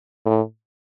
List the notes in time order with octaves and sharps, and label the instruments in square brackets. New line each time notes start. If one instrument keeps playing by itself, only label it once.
[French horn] A2